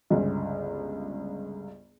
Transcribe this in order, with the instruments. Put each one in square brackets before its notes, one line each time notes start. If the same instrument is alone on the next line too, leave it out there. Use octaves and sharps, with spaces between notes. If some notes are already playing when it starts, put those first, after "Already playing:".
[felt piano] G1 C#2